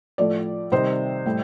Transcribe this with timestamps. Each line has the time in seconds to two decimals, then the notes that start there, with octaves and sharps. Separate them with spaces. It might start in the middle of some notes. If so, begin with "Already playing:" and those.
0.18 A2 F3 A3 D5
0.72 C3 D#3 G3 C5 D#5
1.26 A2 G3